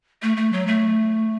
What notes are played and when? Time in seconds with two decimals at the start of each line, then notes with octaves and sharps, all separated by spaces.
0.22 A3
0.37 A3
0.53 F#3
0.67 A3